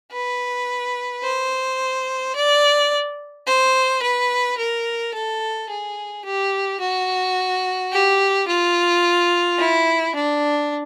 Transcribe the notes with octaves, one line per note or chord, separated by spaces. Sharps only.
B4
C5
D5
C5
B4
A#4
A4
G#4
G4
F#4
G4
F4
E4
D4